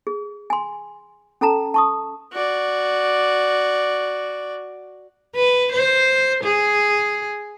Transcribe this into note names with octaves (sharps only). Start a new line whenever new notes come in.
G#4
G#5 C6
C#4 A4 A5 A#5
A5 C#6 D#6
F#4 D5
B4
C5
G#4